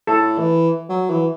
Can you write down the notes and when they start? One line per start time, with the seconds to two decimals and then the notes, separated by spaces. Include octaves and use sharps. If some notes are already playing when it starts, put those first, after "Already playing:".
0.07 A2 A4
0.38 E3
0.89 F#3
1.10 E3